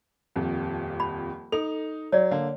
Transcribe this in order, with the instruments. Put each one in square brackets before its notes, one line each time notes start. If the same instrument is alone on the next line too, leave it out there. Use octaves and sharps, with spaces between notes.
[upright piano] D#1 F2
[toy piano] B5
[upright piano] D#4 F7 [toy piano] A4
[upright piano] F#3 [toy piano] C#5 D5
[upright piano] D3 A#3